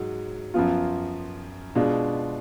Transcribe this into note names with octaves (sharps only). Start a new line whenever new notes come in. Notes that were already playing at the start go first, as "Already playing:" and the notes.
Already playing: G#2 F#3
F#2 F3 B3 F4
B2 G#3 D4 F4